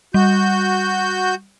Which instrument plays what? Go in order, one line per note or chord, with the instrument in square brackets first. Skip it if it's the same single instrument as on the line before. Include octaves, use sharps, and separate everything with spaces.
[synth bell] G3 [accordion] F#4 G6